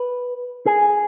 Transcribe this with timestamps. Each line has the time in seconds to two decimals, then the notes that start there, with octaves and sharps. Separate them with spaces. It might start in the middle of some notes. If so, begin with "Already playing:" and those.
Already playing: B4
0.66 G#4